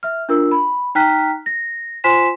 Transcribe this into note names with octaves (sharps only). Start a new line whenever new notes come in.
E5 F6
D4 F4 A#4 E6
B5
D#4 G5 A#5 F6 F#6 B6
A#6
F4 C5 G#5 C6 B6 E7